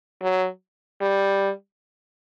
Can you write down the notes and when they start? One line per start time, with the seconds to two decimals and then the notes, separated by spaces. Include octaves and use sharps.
0.22 F#3
1.02 G3